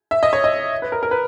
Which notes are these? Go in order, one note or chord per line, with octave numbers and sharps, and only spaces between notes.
E5
D#5
C#5
D#5
B4
A#4
A#4
B4